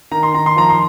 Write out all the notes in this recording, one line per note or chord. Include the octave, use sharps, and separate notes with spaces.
D#3 A#5
C6
D#3 A#5
C6
F3 A#5
C6